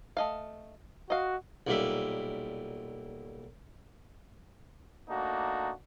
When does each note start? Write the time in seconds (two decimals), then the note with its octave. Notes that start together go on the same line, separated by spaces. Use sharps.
0.17 A3 D#5 F5
1.10 F#4 D#5 F5
1.67 B1 A#2 G3 E5
5.08 A3 A#3 D4 D#4 F#4